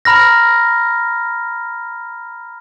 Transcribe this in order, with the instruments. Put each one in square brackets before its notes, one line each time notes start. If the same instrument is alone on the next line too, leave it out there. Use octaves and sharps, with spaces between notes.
[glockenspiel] A#5 B5 F6 A#6